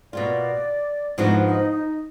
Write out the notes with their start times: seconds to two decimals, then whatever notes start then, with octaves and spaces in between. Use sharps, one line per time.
0.13 B2 A#3 F4 D5
1.18 G#2 F3 B3 D4 D#4 F#4
1.44 D#4
1.70 D#4